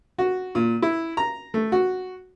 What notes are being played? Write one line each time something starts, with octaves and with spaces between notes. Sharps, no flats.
F#4
A#2
E4
A#5
A3
F#4